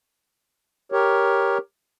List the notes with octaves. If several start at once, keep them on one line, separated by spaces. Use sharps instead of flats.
G4 A#4 C#5